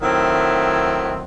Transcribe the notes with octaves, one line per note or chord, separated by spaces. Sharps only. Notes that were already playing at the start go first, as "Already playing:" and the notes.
D#3 F#3 A3 C4 E4